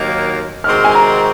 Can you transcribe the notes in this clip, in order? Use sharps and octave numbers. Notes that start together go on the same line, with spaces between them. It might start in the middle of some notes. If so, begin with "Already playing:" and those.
Already playing: D#2 D#3 F#3 A#3
C3 D#3 G#3 C4 F#4 F6
G#5
A#5